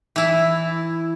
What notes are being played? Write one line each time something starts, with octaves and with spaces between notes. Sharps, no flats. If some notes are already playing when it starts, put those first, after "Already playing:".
E3 E4